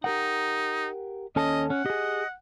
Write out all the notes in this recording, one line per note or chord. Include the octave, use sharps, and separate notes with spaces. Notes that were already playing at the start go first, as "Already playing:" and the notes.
D#4 G4 A#4 F#5
D#2 C#4 A4 D#5 A5
C#4 F#5
G4 G#4 D#5